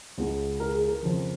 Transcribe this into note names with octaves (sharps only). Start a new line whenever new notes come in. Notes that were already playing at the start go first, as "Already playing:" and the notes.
C#2 C#3 G#3 B3
A#4
G#4
A#4
F2 C#3 F3